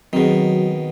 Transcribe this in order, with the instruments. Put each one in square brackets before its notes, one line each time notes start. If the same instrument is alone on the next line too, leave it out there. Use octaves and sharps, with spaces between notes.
[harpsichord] B2 D#3 [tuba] F#3 [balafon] C4 G#4